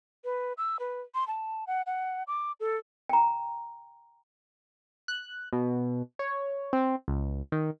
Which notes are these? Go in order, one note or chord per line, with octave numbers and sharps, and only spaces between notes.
B4
E6
B4
C6
A5
F#5
F#5
D6
A4
G5 A#5
F#6
B2
C#5
C4
C#2
D#3